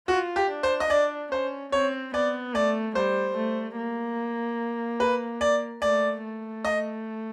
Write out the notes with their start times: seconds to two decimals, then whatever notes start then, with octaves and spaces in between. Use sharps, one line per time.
0.08 F4 F#4
0.36 G4
0.49 D4
0.63 C5
0.80 D#5
0.90 D4 D5
1.31 C#4 C5
1.72 C4 C#5
2.14 B3 D5
2.54 A3 D5
2.95 G3 C5
3.36 A3
3.77 A#3
5.00 B4
5.41 D5
5.82 A3 D5
6.23 A3
6.65 D#5